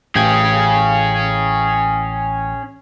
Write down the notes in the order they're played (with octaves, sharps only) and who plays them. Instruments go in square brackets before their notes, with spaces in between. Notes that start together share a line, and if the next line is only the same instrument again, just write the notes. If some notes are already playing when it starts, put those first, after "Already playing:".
[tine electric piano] A1 G5 G#6 [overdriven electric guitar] C#4 G#4